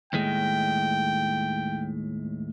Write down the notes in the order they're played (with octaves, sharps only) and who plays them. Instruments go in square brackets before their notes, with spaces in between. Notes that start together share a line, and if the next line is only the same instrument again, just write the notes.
[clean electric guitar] D#2 A2 G#3 [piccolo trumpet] G5